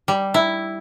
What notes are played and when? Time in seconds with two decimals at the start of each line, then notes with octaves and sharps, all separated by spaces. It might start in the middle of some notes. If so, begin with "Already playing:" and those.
0.08 G3
0.34 E4